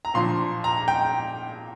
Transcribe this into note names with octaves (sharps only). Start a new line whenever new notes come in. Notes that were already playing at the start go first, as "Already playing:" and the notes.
A#5
A#2 F3 D4 C6
A#5
G5